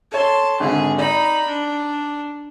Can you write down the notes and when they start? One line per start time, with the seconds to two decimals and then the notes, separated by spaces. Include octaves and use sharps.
0.12 A4 C#5 A5 C6
0.60 G#1 D3 G#4
0.98 D#4 D5 B5
1.48 D4